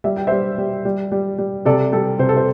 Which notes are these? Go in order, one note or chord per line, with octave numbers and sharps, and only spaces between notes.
G3 E5
G5
G3 C5 E5
G3
G3
G3
G3
C3 A4 D5
G3 A4
C3 C5
A4
C5